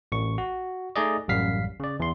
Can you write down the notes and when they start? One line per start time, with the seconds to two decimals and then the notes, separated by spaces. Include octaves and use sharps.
0.12 A1 C#6
0.38 F#4
0.96 A3 D#4 G#4 D5 D#5
1.28 A1 F#2 G3 F5 B6 C7
1.80 C#3 D5
2.00 E2 C6